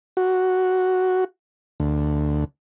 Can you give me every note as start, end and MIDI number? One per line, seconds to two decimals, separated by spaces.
0.17 1.24 66
1.80 2.45 38